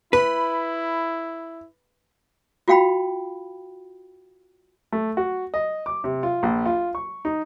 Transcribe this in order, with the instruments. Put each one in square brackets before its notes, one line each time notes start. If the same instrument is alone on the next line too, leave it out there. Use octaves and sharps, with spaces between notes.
[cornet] E4 [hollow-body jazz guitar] B4 [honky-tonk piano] B5
[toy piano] F4 F#4 F5 G5 B5
[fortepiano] A3
F#4
D#5
D6
C3
F4
A#1
F4
C#6
D#4